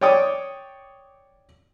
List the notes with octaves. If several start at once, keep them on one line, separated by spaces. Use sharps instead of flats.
C#5 D5 G5 D6 D#6